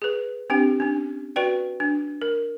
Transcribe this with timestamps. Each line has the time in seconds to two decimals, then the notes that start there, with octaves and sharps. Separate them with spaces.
0.02 G#4 B4
0.50 C4 D4 G4 G5
0.80 C#4 D4
1.36 F#4 B4 D5 G5
1.80 D4
2.22 A#4